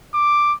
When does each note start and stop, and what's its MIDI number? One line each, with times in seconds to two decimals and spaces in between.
0.14 0.54 86